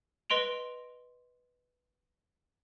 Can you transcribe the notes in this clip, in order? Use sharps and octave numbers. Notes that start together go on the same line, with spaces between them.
B4 D#5 C6 D7 F7